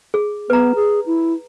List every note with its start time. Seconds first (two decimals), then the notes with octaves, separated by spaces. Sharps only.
0.14 G#4
0.50 B3 B4 A#5
0.75 G#4
1.06 E4